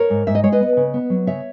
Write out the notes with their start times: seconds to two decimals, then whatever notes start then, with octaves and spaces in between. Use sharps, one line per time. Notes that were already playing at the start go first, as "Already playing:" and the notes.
Already playing: A#4 C#5
0.10 G#2
0.27 G#2 E5
0.35 D#5
0.44 G#3 C#5
0.52 B4 D#5
0.61 B3
0.77 C#3
0.94 B3
1.10 F#3
1.27 C#3 C#5 E5